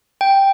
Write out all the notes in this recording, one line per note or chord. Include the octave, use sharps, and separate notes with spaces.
G5